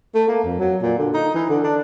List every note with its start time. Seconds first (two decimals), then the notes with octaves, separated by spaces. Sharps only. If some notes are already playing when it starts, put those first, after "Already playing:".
0.15 A3
0.28 A#3
0.44 F2
0.59 F#3
0.82 A#2
0.98 D3
1.14 D#4
1.34 E3
1.50 D3
1.64 D4